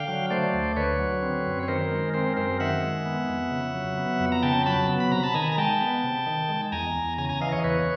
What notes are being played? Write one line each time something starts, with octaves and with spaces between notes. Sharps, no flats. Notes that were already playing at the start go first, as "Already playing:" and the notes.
Already playing: D3 F5 G5
F#3
A3 C5 D5
D2
D3 B4 C#5
F#3
C4
F#2
C#5
D#3 A#4 C5
G#3
C4 A#4 C5
F#2 A#4 C5
D#3 E5 F#5
G#3
B3
F2
C#3
F#3
B3
F2
A#5
C#3 G5 A5
F#3 A5 B5
B3
B5
C3 A#5
A5 B5
D#3 G#5 A#5
A#5
G#3 G5 A5
B3
C3
D#3
G#3
E2 G#5 A#5
E2
C#3 G#5 A#5
G#5 A#5
E3 D#5 F5
C#5 D#5
E2 B4 C#5